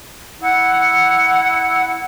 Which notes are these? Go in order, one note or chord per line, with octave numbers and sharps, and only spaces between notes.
E4 F#5